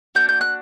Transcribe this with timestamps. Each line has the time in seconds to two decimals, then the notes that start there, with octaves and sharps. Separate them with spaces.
0.15 A#3 D4 F#4 G6
0.29 G6
0.41 F#6